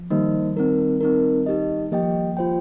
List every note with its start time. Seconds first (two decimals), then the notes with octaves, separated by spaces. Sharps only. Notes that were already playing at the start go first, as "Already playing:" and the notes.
Already playing: F3
0.10 D#3 G3 A#3 D#4 C5 D#5
0.57 C4 D#4 A#4
1.01 C4 D#4 A#4
1.46 D#4 G4 D#5
1.92 F3 A#3 G4 D#5 G5
2.37 F4 C5 G5